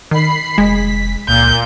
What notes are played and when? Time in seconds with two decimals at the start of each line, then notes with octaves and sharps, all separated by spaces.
0.11 D#3 B5 C7
0.58 F1 G#3 B6
1.28 C#2 A#2 G6